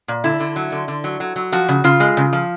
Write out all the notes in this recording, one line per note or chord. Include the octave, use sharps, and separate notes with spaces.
A#2
D3 E4
D3
F#3
D3
D3
F#3
F#3
F#3
F3 F#4
C#3
C#3 F4
G#3
C#3
F3